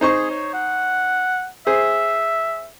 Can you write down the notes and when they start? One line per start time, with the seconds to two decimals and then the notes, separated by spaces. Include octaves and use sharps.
0.01 D#4 G#4 C5 C#6
0.30 C#5
0.54 F#5
1.67 G#4 C5 E5